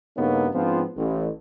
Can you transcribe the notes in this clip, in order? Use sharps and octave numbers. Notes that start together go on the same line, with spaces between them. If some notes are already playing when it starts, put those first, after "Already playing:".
G2 C#3 A#3 B3 C#4 D#4
G#2 F3 B3 C4 D4 F4
A1